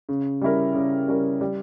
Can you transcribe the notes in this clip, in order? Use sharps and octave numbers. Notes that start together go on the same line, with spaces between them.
C#3
G3 C#4 E4 A#4
C#3
G3 C#4 E4 A#4
G3